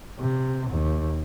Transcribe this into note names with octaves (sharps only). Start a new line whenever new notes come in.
C3
D#2